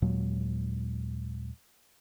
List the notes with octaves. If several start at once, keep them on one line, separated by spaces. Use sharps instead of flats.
D#2 A#2 F#3 G#3